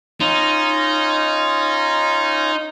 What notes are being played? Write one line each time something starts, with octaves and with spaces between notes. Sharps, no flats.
C#4 D#4 F4